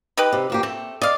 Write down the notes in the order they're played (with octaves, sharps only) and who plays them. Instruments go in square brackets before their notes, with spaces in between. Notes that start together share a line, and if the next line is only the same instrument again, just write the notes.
[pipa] D#4 G4 B4
[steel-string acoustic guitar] C3
F2 A#3 G4
[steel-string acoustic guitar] A3 [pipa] C4
[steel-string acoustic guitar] D5 [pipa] D#5 F5